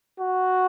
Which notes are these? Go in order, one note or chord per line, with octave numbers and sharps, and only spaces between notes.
F#4